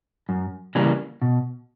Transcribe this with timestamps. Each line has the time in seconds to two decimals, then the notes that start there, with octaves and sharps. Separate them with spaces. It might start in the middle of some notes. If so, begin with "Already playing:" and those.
0.29 F#2
0.75 C#3 E3 G3 A#3
1.22 B2